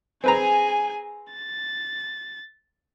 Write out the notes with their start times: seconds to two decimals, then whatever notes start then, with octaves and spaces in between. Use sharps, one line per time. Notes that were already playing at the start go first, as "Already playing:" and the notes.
0.24 C4 G#4 B4 G#5 A#5
1.33 A6